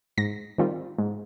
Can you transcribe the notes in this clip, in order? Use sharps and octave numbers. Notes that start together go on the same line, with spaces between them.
G#2 A#6
D#3 G3 C4 F4
G#2